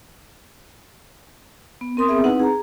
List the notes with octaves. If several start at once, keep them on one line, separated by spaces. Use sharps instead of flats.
B3
C4 A#4 C6 D#6
B3 C4 G#4 E5
C4 D#4 E4 B4 F#5
G#4 A#5